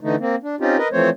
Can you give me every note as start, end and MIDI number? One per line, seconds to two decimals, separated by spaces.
0.01 0.16 50
0.01 0.16 52
0.01 0.16 57
0.01 0.16 63
0.20 0.36 58
0.20 0.36 60
0.43 0.55 62
0.60 0.77 60
0.60 0.77 61
0.60 0.77 63
0.60 0.77 65
0.60 0.77 67
0.78 0.88 70
0.78 0.88 71
0.78 0.88 75
0.92 1.10 52
0.92 1.10 53
0.92 1.10 57
0.92 1.10 60
0.92 1.10 72
0.92 1.10 73